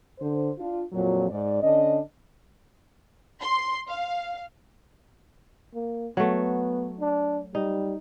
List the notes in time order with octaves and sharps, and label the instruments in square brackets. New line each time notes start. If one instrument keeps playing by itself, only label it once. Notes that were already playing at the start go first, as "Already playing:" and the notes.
[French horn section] D3 C5
D4 F4
F2 A#2 F#3
G#2 D5
D3 C#4 D4 D#5
[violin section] C6
F5
[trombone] A#3
[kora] F#3 A3 [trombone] B3
[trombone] D4
[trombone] G3 [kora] D#4